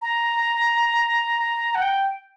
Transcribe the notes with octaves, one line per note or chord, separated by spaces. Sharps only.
A#5
F#5
G5